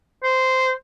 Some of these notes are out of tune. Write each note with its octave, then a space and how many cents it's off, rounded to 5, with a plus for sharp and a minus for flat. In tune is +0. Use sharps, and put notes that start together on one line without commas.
C5 -10